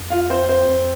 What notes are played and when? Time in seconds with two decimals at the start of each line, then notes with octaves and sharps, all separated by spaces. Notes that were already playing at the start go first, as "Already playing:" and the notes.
Already playing: F2
0.10 F4 F5
0.30 C4 C5
0.49 C4 C5
0.68 F2